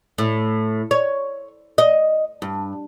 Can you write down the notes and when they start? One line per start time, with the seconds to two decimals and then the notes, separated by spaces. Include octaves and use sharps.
0.18 A2
0.91 C#5
1.78 D#5
2.42 G2